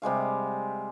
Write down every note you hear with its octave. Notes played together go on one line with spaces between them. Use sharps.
C3 G3 G#3 F5